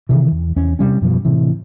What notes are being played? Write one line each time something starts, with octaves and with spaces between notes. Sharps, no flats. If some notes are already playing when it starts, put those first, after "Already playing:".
C3 D#3 E3
E2
E2 C#4
C3 G3 C#4
F#2 B2 F3 G3
A2 C3 E3